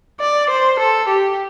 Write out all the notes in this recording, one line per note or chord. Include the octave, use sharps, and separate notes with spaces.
D5
C5
A4
G4